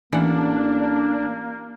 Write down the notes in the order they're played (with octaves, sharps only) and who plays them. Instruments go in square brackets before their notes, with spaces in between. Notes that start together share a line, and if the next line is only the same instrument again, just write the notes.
[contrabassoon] A1 [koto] E3 F#5 [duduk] A#3 [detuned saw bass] D4